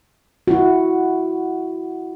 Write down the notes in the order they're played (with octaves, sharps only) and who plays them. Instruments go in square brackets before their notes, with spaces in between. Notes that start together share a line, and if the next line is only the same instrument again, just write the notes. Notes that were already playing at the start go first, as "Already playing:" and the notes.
[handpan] E4 F#4